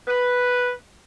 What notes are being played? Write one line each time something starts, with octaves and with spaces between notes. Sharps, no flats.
B4